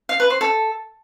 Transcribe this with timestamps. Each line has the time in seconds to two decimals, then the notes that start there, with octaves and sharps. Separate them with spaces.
0.09 F5
0.20 B4
0.30 C5
0.41 A4